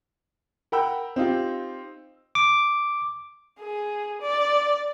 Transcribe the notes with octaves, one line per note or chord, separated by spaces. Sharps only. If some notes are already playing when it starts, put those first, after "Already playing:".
A#4 F#5 G5 B5 E6
C4 D#4 F4 G4
D6
G#4
D5